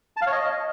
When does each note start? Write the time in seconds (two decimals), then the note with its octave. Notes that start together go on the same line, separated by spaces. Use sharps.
0.17 A5
0.22 F5
0.27 C#5
0.32 D#5